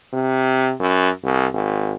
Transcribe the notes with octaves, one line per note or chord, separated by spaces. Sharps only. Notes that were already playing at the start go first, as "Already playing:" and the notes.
C3
F#2
C2
G#1